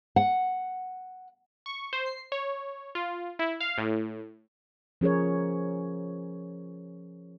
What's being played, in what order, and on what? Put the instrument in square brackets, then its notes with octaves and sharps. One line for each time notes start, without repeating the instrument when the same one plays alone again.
[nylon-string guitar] F#5
[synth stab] C#6
C5
C7
C#5
F4
E4
F5
A2
[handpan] F3 C#4 G#4 A#4 C#5